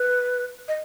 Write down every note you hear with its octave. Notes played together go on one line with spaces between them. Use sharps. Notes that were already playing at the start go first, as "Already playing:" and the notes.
Already playing: B4
D#5